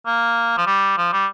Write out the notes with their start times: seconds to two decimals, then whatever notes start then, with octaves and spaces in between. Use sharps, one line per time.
0.07 A#3
0.58 F3
0.67 G3
0.98 F3
1.13 G3